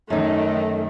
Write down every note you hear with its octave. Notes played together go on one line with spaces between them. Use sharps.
F#2 D#3 A3 D#4